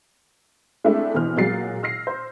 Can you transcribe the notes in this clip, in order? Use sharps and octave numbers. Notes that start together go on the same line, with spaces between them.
G#3 A3 C4 D4 E4
B2 E3 C5 F6
A#2 F#3 G#3 A6 C7
E6 F6 A#6 C7
C5